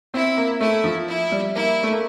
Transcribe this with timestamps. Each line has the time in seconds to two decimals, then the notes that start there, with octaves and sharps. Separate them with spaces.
0.14 C4 E4
0.37 A#3
0.60 A3 E4
0.84 F3
1.08 E4
1.32 G3
1.55 A#3 E4
1.83 A3
1.92 A#3